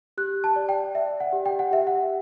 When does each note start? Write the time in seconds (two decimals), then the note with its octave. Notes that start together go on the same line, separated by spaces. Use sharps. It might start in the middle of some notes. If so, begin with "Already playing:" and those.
0.18 G4 F#6
0.44 A5
0.56 D5
0.69 G5
0.95 D5 E5
1.20 F#5
1.33 G4
1.46 G5
1.59 F#5
1.71 G4 E5
1.87 F#5